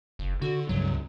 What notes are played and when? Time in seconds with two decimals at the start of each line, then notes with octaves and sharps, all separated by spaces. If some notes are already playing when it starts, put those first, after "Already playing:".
0.19 F#1
0.42 D3 F#4
0.69 C#2 G2 F#3